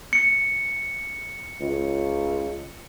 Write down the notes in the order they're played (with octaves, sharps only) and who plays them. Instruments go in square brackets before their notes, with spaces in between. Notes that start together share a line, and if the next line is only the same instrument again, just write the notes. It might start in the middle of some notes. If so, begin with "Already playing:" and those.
[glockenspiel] C#7
[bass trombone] C#2